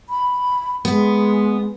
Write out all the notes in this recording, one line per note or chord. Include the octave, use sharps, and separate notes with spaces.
B5
G#3 B3